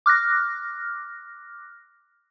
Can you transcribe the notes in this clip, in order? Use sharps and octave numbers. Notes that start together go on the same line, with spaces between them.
D6 F6 F#6 A#6